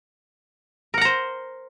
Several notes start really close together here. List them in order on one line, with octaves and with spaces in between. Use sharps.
A#4 F#5 A#5 C5